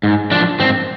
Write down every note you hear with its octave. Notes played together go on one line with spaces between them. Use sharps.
G#2
F3 D4
G#2 C4